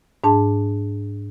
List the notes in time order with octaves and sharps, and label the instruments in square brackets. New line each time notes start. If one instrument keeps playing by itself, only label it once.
[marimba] G#2 D4 G#4 A5